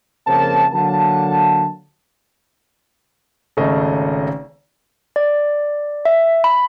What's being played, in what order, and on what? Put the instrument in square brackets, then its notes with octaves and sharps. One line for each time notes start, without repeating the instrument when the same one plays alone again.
[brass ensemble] F2 C#3 A#3 A#4 C5 A5
D3 F#3 A#3 F#5 A5
[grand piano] G#1 C#3 A3 C#4 D#5
[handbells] D5
E5
B5